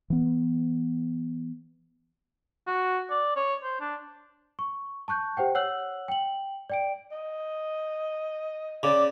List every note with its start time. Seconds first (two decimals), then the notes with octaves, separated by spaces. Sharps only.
0.10 E3 B3
2.67 F#4
3.10 D5
3.36 C#5
3.63 C5
3.80 D4
4.59 C#6
5.08 A5 C#6 F#6 G6
5.37 G4 C5 F#5 G5
5.55 C#5 F#5 E6 F#6 F#7
6.08 G5 F#7
6.70 D5 G5 D7
7.11 D#5
8.83 C#3 D5 D6